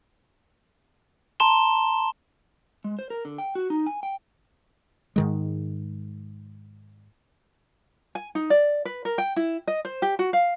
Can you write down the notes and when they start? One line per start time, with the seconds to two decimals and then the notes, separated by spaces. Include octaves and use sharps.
1.40 A5 A#5 C6 E7 G7
2.84 G#3
2.99 C5
3.10 A#4
3.25 D3
3.38 G5
3.55 F#4
3.70 D#4
3.86 G#5
4.03 G5
5.16 G#2 D#3 G#3
8.15 G#5
8.35 D#4
8.50 D5
8.85 B4
9.05 A#4
9.18 G5
9.36 E4
9.68 D#5
9.85 C5
10.02 G4
10.19 F#4
10.33 F5